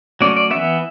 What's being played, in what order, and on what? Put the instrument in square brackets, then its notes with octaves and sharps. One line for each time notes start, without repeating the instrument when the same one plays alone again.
[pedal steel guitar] F#3 A3 C#4 D5
D5
E3 B3 E5